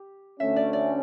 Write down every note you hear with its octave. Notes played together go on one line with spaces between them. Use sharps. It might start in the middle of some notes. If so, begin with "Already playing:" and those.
Already playing: G4
D2 D3 A3 C#4 E5
D5
D5